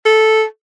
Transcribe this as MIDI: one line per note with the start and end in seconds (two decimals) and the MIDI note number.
0.06 0.44 69